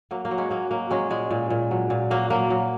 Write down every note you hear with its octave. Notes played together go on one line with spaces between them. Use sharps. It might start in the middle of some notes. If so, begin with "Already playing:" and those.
F#3 A#3
A#3
F#3
G#3 C#4
F#3 A#3
F#3 A#3
F#3 G#3 C#4
A#2 G#3
A#2
A#2
F#3
A#2
F#3 A#3
F#3 A#3
F#3